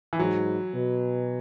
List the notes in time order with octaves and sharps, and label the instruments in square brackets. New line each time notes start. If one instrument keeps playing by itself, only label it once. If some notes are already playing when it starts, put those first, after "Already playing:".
[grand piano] E3
[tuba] G#2 [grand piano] F#3
[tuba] B2